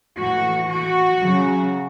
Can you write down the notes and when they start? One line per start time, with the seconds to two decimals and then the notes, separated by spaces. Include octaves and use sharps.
0.19 A2 E3 F#4
0.70 F#4
1.21 C#3 F#3